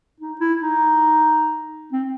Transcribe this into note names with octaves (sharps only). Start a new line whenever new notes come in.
D#4
E4
D#4
C4